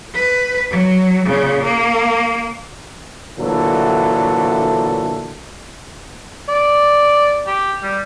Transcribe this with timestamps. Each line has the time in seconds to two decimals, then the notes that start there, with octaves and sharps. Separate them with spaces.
0.14 B4
0.70 F#3
1.25 A#2 C#3
1.63 A#3
3.39 A#2 D3 E3 F#3 A3 A4
6.49 D5
7.47 G4
7.83 G3